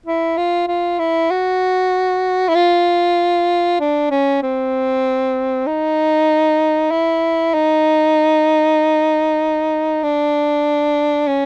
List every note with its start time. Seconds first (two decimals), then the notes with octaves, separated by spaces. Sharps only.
0.06 E4
0.37 F4
0.68 F4
0.99 E4
1.31 F#4
2.48 E4
2.55 F4
3.80 D4
4.11 C#4
4.43 C4
5.67 D#4
6.91 E4
7.54 D#4
10.03 D4
11.27 C#4